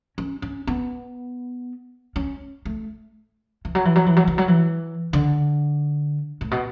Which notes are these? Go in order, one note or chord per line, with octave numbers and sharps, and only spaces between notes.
C#4
C#4
B3
C#4
A3
E3
F#3
E3
F#3
E3
F#3
E3
F#3
E3
D3
A2
B2